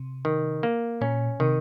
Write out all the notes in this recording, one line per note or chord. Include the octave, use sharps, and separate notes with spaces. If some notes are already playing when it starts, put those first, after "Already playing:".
Already playing: C3
D#3
A#3
A#2 C#4
C3 D#3